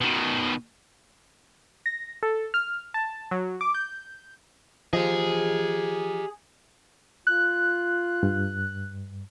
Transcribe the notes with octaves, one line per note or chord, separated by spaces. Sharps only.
B2 D#3
A#6
A4
F6
A5
F#3
D6
G6
F3 G4 G#4 D#5
F4 F#6
G2